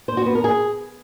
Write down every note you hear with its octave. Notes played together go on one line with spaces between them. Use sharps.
C5
F#4
B3
A#4
G#4